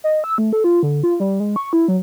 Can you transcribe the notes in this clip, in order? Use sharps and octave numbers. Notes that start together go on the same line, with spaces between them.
D#5
E6
A3
A4
F4
D3
F4
G3
G#3
C#6
E4
F#3